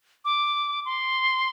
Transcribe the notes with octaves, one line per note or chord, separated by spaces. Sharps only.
D6
C6